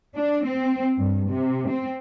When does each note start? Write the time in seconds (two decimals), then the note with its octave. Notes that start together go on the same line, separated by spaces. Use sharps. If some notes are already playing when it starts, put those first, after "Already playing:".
0.16 D4
0.46 C4
0.98 G2
1.29 C3
1.68 C4